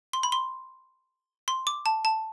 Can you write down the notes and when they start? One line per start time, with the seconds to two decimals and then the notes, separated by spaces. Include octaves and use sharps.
0.13 C6
0.23 B5
0.32 C6
1.48 C6
1.67 D6
1.86 A5
2.05 A5